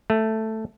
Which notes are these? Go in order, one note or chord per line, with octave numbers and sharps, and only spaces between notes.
A3